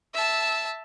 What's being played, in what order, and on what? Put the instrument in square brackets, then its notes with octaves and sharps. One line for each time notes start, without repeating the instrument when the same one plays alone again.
[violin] E5 A5